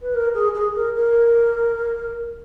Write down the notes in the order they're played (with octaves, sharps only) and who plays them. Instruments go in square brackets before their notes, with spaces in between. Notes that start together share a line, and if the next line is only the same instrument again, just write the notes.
[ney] B4
A#4
G#4
G#4
A#4
A#4